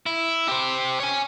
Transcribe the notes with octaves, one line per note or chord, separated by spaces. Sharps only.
E4
G4 C5
C#5 G#5